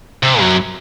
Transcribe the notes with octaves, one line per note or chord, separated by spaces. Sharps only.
C3
F#2